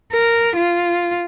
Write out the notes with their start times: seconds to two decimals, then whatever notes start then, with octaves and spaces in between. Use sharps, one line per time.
0.13 A#4
0.57 F4